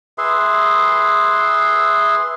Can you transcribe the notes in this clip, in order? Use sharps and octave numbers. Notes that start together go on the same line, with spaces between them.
G#4 B4 E5 C6